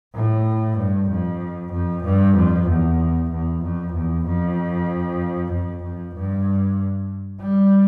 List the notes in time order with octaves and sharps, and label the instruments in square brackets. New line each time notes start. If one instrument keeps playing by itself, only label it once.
[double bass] A2
G2
F2
F2
G2
F2
E2
E2
F2
E2
F2
F2
F2
G2
G3